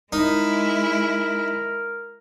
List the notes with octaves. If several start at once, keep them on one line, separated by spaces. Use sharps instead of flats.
G#3 D#4 E4 A#4